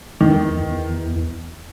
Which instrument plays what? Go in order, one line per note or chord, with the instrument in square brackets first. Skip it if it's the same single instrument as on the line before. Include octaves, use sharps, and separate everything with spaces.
[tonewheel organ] E2 [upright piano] D#3
[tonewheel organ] E2